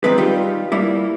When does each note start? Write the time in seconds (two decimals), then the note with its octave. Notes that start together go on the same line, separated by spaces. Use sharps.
0.04 D#3 F3 G#3 C4 B4
0.18 G3 D#4 F4 G4
0.72 G3 A#3 E4